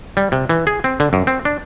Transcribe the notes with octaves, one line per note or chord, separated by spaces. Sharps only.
G3
C3
E3
G#4
C4
D3
F#2
C4
D4